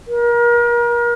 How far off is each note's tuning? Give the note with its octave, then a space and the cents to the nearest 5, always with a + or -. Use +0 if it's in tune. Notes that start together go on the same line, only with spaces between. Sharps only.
A#4 +35